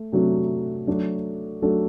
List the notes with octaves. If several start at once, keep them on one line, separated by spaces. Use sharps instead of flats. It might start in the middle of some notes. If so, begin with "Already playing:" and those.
Already playing: A3
C3 F#3 A3 D4 F#4
F#3 A3 D4 F#4 A4
F#3 A3 D4 F#4 A4